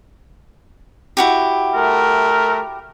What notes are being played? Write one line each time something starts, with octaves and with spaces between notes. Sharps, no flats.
E4 F#4 G4
A3 A#4